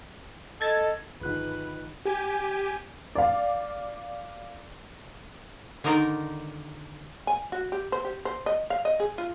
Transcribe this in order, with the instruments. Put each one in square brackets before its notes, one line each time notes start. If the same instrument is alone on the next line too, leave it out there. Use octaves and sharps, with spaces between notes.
[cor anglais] A4 [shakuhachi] D#5 [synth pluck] G#6 A6
[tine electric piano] G1 F#6 [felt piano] D#3 F3 G#3 [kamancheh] B4
[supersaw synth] G4 G#5
[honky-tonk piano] D5 F5
[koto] D3 D#3 D#4 A#4 C5 D5
[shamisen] G#5
F#4
G4
C5
G4
C5
D#5
F5
D#5
G#4
F4